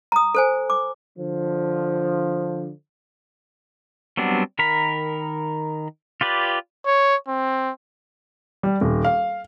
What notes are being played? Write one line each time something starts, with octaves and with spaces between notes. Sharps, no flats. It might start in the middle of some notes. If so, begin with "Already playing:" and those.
A#5 D#6
A4 C5 G#5
D6
D3 F3
F#3 G3 B3 C4 D4
D#3 A#4 A#5 B5
F4 G4 B4 D5
C#5
C4
G3
D#1
F5